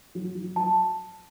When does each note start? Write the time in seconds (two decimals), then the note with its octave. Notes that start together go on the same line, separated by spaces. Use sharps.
0.15 F#3
0.35 F#3
0.56 F#3 A5